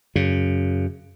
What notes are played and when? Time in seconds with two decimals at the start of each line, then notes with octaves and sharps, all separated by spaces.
0.16 F#2 C#3